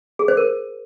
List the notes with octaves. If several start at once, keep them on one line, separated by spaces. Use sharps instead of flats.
G#4
C5
A#4